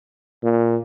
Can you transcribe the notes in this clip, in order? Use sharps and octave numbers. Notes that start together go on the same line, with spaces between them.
A#2